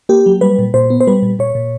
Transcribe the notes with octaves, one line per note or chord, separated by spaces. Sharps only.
A#3 G4
F#3
G3 B4
A#2
A#2 C5
B3
C5
G3 B4
A#2
A#2 C#5
A#2